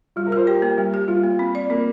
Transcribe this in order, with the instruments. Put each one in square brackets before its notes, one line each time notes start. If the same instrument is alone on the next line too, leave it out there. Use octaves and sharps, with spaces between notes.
[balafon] G3 [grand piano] F4
[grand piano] A#4
[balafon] F4 [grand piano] C5
[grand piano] G4 [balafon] C5
[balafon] A#3
G3
G4
[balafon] G3 [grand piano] F4
[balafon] A#3
C4
D5
[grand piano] A#3 [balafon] C4